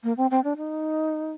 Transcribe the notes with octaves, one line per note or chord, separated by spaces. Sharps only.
A#3
C4
C4
D4
D#4